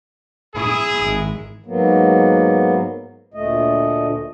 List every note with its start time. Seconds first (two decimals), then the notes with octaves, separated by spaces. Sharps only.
0.55 E4 G#4 D#6
1.00 G#1 G#3
1.66 G#2 F#3 A#3 B3
3.34 D2 A#2 A3 D#5